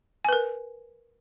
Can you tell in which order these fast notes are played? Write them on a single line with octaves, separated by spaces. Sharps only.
G#5 B4 A#4